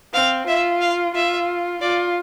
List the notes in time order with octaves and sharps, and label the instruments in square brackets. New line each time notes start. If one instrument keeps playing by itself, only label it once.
[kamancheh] C4 [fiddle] F5
[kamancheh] F4 [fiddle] E5
[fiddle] F5
[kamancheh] F4 [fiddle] E5
[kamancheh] F4 [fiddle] D5